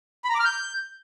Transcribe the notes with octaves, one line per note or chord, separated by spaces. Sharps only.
B5
A#5
D6
F6
G6